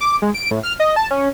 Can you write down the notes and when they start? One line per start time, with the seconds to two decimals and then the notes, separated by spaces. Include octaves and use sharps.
0.01 D6
0.22 G#3
0.34 D7
0.51 A2
0.63 F6
0.80 D#5
0.96 A5
1.11 C#4